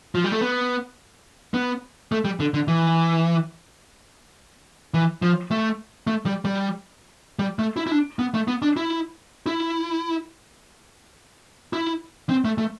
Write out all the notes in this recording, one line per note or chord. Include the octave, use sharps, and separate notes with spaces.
F3
G3
A3
B3
B3
A3
G3
D3
D3
E3
E3
F3
A3
A3
G3
G3
G3
A3
E4
E4
D4
B3
A3
B3
D4
E4
E4
E4
C4
A3
A3